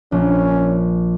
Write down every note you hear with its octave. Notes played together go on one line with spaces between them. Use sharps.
A#1 C#4